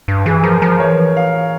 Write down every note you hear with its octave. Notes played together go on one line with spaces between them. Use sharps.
G2
E3 G#4
F3 A#4
F3 A#4
E3 C#5
F5